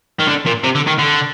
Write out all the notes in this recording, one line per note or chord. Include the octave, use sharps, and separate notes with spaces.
D#3
D3
A#2
C3
D3
D#3
D3